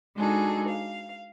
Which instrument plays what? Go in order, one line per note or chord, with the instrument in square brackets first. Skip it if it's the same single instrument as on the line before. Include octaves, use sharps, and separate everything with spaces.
[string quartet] G#3 D4 D#4 F#4 G#4 A4
F5